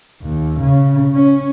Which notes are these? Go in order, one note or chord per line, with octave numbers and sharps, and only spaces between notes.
D#2
C#3
C#4